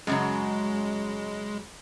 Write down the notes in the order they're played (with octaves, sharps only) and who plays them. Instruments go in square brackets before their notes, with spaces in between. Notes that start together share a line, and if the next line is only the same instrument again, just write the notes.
[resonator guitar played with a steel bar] F#2 C#3 F#3 [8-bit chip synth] G#3